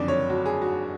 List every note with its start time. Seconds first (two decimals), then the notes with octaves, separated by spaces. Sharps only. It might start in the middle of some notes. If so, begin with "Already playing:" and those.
Already playing: F#1 F2 D3 D5
0.08 C#5
0.30 F#4
0.45 G#4
0.62 F#4